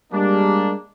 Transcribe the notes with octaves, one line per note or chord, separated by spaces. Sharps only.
G3 G#3 A#3 D4